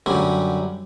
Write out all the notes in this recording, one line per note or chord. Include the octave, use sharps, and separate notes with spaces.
F#2 D3 F#3 G3